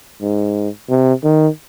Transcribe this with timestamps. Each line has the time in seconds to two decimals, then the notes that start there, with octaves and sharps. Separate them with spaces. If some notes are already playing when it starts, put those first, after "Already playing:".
0.21 G#2
0.90 C3
1.24 D#3